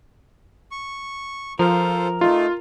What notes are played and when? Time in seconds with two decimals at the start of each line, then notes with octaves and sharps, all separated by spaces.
0.71 C#6
1.59 F3 F4 A4 A#4 C5
2.21 A3 D#4 F4